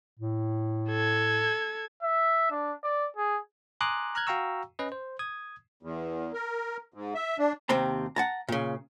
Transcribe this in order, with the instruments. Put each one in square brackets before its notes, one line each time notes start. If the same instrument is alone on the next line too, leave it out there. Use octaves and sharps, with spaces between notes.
[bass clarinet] A2
[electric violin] A4 G#6
[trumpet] E5
D4
D5
G#4
[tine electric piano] G#5 A#5 C6 D6 D#6 F#6
A#5 F6 F#6 G#6
F#4 F5 G5 A#5 C#6 E6
C#4 B4 D#5
C5
D#6 G#6
[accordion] E2
A#4
G#2
E5
D4
[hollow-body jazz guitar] D#2 C3 C4 A#5
F#5 A5 A#5
A#2 C#3